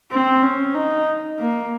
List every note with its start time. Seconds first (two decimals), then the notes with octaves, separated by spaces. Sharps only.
0.11 C4
0.43 C#4
0.74 D#4
1.39 A#3